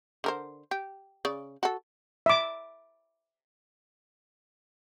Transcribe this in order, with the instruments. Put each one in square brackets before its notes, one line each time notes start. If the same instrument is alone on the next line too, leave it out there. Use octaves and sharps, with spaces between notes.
[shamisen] D3 A#4 C5
G4
C#3 D5
F#4 A4
[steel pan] E5 D6